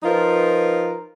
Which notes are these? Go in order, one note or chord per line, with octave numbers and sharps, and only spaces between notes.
F3 D#4 F4 A#4 B4